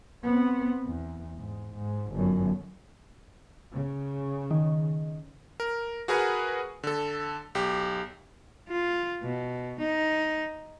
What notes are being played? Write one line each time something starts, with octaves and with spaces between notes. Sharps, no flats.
B3 C4
E2
G#2
G#2
G1 F#2
C#3
D#3
A#4
F#4 G#4 A#4 B4 F#5 G#5
D3 A4
B1 G4
F4
B2
D#4